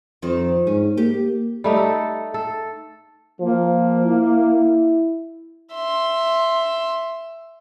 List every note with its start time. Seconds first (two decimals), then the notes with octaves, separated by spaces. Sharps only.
0.22 F2 D#3 C4
0.67 G#2 C#4
0.97 A#3 G4
1.64 G3 A3 D#4
1.76 A4
2.34 A4
3.41 F3 A#3
4.05 E4
5.74 E5 C6